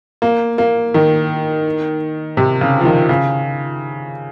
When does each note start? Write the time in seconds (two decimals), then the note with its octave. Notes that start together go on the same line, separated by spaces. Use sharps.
0.22 A#3
0.58 A#3
0.94 D#3
2.37 C3
2.61 C#3
2.81 F3
2.85 D#3
3.09 C#3